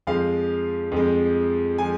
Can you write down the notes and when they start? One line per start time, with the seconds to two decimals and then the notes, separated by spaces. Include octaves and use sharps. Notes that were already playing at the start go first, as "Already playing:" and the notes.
0.07 F2 F3 G#3 F5
0.92 F2 F3 G#3
1.78 F3 G#3 G#5